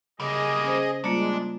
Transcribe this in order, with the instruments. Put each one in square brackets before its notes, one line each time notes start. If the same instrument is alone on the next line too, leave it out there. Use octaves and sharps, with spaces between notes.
[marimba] C#3 [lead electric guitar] G3 A#3 [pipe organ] G#4 D#5
[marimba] C#4 C5
[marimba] G3 A#3 F4 [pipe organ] G#3 [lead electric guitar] D4